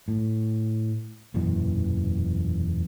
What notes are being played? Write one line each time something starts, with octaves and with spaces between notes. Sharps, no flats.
A2
E1 F#2 A#2 E3